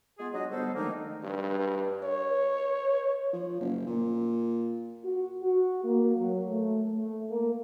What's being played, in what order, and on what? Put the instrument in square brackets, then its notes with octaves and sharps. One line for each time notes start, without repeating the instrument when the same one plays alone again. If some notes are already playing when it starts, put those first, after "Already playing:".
[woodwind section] G#3 B3 F4 G#4
F#3 D4 G4 D#5
D3 G3 G#3 B3 A4 C5
D3 D#3 F3 A3 A#3 D#4
[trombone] G2
C#5
[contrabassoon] F3
F#1
A#2
[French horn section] F#4
F#4
A#3
F#3
A3
A3
A#3